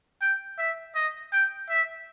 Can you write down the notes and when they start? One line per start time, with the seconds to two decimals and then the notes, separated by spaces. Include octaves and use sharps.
0.21 G5
0.58 E5
0.95 D#5
1.33 G5
1.70 E5